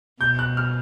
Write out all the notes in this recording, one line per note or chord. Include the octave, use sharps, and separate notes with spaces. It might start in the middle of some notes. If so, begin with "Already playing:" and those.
B2 G6
F#6
F6